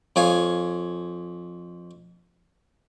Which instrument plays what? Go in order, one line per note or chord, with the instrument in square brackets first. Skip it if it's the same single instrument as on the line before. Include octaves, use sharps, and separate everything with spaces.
[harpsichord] F2 C#5 F5 G#5